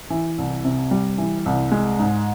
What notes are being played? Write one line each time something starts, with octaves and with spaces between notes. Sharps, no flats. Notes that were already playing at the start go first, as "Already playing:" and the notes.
E3
C2
C3
G3
E3
C2
G#3
G#2